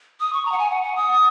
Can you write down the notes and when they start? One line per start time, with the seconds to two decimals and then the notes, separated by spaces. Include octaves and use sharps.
0.20 D#6
0.33 C#6
0.45 A#5
0.52 F#5
0.58 G#5
0.70 F#5
0.83 F#5
0.96 D#6